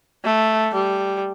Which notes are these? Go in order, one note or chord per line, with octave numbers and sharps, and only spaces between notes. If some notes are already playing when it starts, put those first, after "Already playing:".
A3
G3